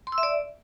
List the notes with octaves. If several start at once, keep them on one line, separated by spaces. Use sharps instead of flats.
C6
E6
E5
D5